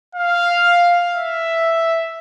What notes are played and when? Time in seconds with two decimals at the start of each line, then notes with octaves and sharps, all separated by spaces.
0.15 F5
1.15 E5